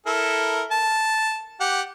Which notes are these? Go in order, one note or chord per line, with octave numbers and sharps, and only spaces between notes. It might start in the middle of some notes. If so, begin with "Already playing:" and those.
E4 A4 A#4
A5
G4 F#5